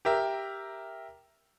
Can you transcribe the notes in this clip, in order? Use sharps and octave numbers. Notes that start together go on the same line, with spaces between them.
G4 A#4 E5